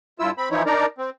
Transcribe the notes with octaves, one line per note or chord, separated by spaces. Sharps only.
G2 E4 F4 E6
C4 B5
E3 F3 D#4 E4 C#5
D4 D#4 A#4 D5 A#5
C4